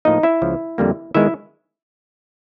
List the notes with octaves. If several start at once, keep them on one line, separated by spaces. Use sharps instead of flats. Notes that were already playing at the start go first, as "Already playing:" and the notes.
A2 F3 A#3 D#4 D#5
E4 E5
C#2 C#3 F3
F2 D3 G3 A#3
D#3 G#3 B3 E4 E5